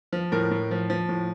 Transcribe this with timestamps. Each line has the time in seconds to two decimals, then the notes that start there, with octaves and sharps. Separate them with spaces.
0.13 F3
0.32 A2 A#4
0.51 A2
0.71 F3
0.90 F3
1.09 A2